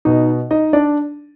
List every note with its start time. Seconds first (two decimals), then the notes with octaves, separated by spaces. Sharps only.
0.05 B2 D#4
0.51 D#4 D#5
0.73 D4 D5